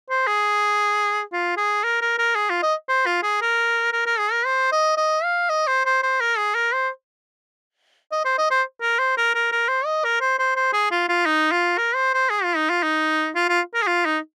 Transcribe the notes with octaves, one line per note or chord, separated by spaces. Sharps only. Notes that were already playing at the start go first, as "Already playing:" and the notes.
C5
G#4
F4
G#4
A#4
A#4
A#4
G#4
F4
D#5
C5
F4
G#4
A#4
A#4
A#4
G#4
A#4
C5
D#5
D#5
F5
D#5
C5
C5
C5
A#4
G#4
A#4
C5
D#5
C5
D#5
C5
A#4
C5
A#4
A#4
A#4
C5
D#5
A#4
C5
C5
C5
G#4
F4
F4
D#4
F4
A#4
C5
C5
G#4
F4
D#4
F4
D#4
F4
F4
A#4
G#4
F4
D#4